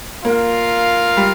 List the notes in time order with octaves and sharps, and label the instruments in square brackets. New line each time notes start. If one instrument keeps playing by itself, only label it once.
[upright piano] A#3 [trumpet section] F4 A#4 F5
[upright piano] G3